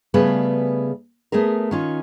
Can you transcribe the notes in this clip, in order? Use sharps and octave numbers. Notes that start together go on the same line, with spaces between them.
C#3 G3 A3 B3 G#4 B4
A3 B3 G#4 A#4
D#3 C#4 F4